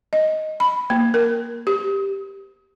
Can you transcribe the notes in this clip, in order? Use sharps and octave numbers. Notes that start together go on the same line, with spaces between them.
D#5
B5
A#3
A#4
G4